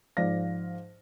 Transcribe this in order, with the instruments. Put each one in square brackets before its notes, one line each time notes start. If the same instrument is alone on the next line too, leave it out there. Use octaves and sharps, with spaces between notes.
[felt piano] G#2 F3 D5 F5 A#6